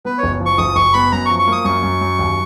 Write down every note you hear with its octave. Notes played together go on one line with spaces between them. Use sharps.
B3 B4
C#5
F#1
F3
C#6
F#1 D#6
F#1 C#6
B3 B5
F#2 A#5
F3 C#6
C#6
A#3 D#6
F#2 C#6
F#2
F#2
D#2